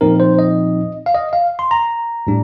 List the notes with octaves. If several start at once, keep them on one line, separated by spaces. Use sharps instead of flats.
A#2 F3 C4 D#4 A#4
C5
D#5
F5
D#5
F5
C6
A#5
A2 G3 D4